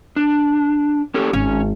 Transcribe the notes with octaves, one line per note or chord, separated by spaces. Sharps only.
D4
C#4 G4 A4
G#1 C#4